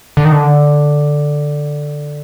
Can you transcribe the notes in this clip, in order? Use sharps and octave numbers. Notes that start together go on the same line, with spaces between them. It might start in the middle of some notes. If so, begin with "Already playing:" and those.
D3
D#3
D3